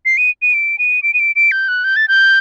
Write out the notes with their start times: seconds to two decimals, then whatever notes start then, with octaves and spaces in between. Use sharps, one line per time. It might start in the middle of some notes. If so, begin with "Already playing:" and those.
0.05 C7
0.18 D#7
0.42 D#7
0.54 D7
0.79 D#7
1.03 D7
1.14 D#7
1.19 D7
1.36 D7
1.52 G6
1.68 F#6
1.84 G6
1.96 A6
2.08 G6